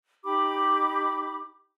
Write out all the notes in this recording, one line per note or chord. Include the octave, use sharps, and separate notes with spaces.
D#4 G4 B5 D6